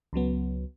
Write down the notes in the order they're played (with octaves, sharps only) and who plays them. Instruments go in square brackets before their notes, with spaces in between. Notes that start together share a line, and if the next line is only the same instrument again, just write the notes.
[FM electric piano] C#2 C#3 F#3 B3